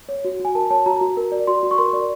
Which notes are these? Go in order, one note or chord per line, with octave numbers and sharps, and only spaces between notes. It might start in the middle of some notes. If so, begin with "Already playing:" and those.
C#5
F#4
F#4 G#5
A#4 A5
C#5 A5
F#4 A#5
F#4
A#4
D5
F#4 C6
F#4
C#6
A#4 C6
D5